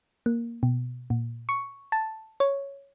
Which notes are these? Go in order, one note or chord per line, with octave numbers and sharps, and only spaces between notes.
A#3
B2
A#2
C#6
A5
C#5